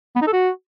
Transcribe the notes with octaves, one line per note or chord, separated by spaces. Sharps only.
B3
D#4
A4
F#4